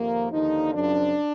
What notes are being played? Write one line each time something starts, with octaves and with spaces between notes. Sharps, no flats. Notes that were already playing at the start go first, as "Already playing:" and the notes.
Already playing: F2 C3 D#3 A#3
D#2 D3 F3 D#4
F#2 C#3 F3 D4